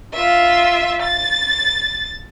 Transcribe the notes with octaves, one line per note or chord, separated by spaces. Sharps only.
F4 E5
A6